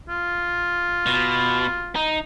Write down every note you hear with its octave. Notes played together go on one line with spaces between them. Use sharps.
F4
B2
D#4